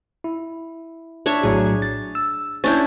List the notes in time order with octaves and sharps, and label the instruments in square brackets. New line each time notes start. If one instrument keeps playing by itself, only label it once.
[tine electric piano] E4
[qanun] D4 C#5 E5
[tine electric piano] A#1 A2 F#3 [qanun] G#4
[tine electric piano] A6
E6
[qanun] C#4 D4 E4 [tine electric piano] G6 A6